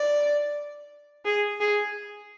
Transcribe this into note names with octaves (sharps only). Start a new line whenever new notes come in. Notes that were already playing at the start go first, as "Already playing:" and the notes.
Already playing: D5
G#4
G#4